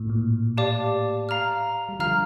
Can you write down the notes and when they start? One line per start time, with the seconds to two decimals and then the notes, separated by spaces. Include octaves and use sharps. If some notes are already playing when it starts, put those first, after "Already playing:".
Already playing: A2
0.09 A#2
0.57 G4 D5 F5 A5 D6
1.29 F5 A#5 F6
1.89 G3
1.99 D3 F3 F5 A#5 F6